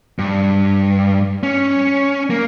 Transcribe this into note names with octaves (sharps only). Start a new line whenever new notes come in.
G2
C#4
A#3